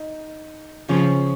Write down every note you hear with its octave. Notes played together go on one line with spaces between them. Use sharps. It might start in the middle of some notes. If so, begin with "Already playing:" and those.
Already playing: D#4
C#3 F3 C#4